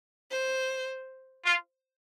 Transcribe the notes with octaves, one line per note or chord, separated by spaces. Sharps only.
C5
F4